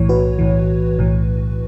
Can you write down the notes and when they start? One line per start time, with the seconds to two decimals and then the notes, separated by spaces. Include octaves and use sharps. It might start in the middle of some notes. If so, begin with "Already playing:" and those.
Already playing: B1 A2 E3 C#5
0.09 F#4 B4
0.39 B1 A2 E3
0.99 B1 A2 E3